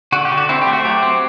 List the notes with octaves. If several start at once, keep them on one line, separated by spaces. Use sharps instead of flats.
D3 F#4
G4
D3
F#4
C4 E4
G4
A3
F#4
F#3 G4
C4